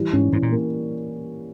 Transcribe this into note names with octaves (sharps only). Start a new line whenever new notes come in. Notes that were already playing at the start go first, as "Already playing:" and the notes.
Already playing: E3 G3
G#2 C#4
G#2 E3
A#2
A#3